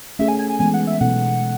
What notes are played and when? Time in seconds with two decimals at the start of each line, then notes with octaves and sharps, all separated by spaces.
0.19 A3 C#4 G#4 E5
0.28 G#5
0.39 G#5
0.49 G#5
0.59 E3 G#3 B3 G#5
0.74 F#5
0.87 E5
1.01 B2 F#3 B3 D#4 A4 F#5
1.42 G#3